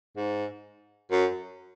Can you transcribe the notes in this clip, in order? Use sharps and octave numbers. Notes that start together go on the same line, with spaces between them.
G#2
F#2